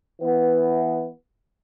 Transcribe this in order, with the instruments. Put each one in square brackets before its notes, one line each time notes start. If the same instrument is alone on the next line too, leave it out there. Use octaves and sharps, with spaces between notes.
[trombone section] E3 B3